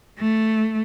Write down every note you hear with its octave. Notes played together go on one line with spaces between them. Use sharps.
A3